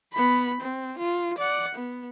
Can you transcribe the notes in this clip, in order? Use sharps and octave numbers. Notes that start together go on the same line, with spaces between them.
B3 B5
C4
F4
D5 F#5
B3